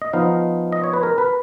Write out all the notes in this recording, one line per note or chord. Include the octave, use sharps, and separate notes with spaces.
D#5
F3 B3 D#4 F5
D#5
C#5
B4
A#4
B4